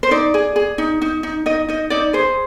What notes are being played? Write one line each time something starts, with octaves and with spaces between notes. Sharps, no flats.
C5
D#4 D5
G#4
G#4
D#4
D#4
D#4
D#4 D#5
D#4 D#5
D#4 D5
G#4 C5